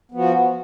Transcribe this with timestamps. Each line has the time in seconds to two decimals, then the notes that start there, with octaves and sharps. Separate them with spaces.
0.12 B3
0.14 F3
0.17 F#4